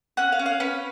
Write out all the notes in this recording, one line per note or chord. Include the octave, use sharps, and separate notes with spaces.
C#4 F#5
F5
C#4
F5
C#4 B4